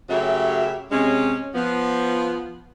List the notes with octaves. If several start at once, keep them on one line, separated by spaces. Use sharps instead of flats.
F#2 C#3 F#3 A3 G4 E5
C3 G#3 C#4
F3 B3